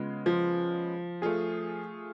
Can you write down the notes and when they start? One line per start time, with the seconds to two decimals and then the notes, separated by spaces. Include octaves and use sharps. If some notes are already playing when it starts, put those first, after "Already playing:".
Already playing: C#3 G#3 B3 F4
0.26 F3
1.22 A3 F4 G#4